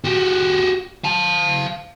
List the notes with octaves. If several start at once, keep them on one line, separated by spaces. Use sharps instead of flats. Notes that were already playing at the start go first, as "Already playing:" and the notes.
F#4 G4
F5 A5